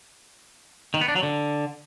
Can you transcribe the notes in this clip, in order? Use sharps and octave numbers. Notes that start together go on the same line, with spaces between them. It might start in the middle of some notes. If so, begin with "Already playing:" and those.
D#3
B3
D4
F#3
D3